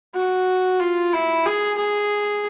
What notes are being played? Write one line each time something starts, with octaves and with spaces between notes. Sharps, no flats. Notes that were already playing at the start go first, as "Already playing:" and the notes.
F#4
F4
E4
G#4
G#4